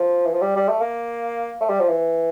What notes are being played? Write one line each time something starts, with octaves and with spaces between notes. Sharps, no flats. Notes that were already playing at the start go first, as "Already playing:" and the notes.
Already playing: F3
E3
F3
G3
G3
A3
A#3
A3
G3
F3
E3